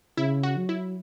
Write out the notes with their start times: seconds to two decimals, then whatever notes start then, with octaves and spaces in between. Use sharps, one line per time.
0.17 C#3 E4
0.43 F#4
0.57 F#3
0.69 E4